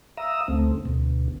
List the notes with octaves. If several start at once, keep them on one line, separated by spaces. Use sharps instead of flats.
E5 F5 A#5 D#6 E6
D2 A3 C4
D2 B2